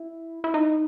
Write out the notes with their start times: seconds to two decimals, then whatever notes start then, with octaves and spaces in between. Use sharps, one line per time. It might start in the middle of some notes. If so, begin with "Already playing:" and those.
Already playing: E4
0.44 E4
0.54 D#4